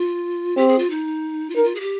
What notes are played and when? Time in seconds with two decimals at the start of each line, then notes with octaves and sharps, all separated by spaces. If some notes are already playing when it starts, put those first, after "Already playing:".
Already playing: F4
0.56 C4 G4
0.68 G#4
0.79 F4
0.90 D#4
1.50 F4
1.55 D#4 A#4
1.64 F4
1.75 G#4
1.80 G4